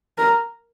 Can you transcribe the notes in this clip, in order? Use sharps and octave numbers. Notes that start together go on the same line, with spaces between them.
A#4